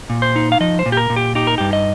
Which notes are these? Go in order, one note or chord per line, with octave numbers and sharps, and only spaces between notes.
A#2
C5
D#4
F5
F3 D#5
C5
A#2
G4
A#4
A#2
G4
D#4 G4
A#4
G2 G4
D#5